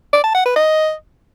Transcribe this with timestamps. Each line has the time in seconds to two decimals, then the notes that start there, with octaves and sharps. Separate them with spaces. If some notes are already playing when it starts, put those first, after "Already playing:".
0.13 D5
0.24 A5
0.34 F#5
0.45 B4
0.56 D#5